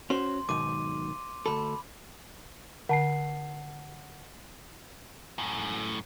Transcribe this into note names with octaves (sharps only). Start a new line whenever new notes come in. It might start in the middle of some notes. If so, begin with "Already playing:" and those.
C#4 F#4 C5 C6
B1 G#2 D#3 D6 D#7
D2 A4 B5
D3 F#5 A5 C7
F#2 A2